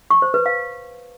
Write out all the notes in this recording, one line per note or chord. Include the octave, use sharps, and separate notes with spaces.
C#6
C5
B4
F5